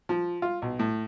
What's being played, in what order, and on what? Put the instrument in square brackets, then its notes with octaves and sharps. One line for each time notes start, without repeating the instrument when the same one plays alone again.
[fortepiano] F3
F4
B1
A2